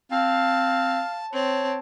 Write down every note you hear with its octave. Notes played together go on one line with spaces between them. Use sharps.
C4 F5 A5
C4 C#5 A5